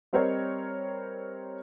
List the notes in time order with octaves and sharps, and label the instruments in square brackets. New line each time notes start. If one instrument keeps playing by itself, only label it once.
[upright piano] G3 C4 A#4 C5 C#5 D#5